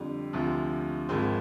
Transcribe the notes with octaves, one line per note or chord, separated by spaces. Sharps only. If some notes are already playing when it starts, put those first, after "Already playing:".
Already playing: F2 D3 G3
D2 C3 F3
G#1 G#2 F3 C4